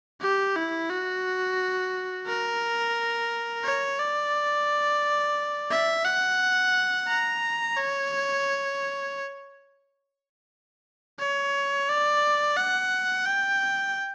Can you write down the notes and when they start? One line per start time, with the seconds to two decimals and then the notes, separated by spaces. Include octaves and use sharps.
0.21 G4
0.56 E4
0.90 F#4
2.27 A#4
3.64 C#5
3.99 D5
5.71 E5
6.05 F#5
7.07 A#5
7.77 C#5
11.19 C#5
11.89 D5
12.57 F#5
13.25 G5